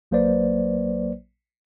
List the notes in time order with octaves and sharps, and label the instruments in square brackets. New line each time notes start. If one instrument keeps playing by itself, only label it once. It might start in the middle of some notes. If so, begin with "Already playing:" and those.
[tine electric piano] A#1 F#3 A#3 B4 C5 D5